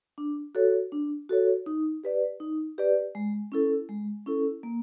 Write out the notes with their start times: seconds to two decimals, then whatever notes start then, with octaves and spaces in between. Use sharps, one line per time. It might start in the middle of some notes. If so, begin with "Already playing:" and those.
0.18 D4
0.55 F#4 A4 C#5
0.92 D4
1.29 F#4 A4 C#5
1.66 D#4
2.04 G4 B4 D5
2.40 D#4
2.78 G4 B4 D5
3.15 G#3
3.52 C#4 E4 A4
3.89 G#3
4.26 C#4 E4 A4
4.63 A#3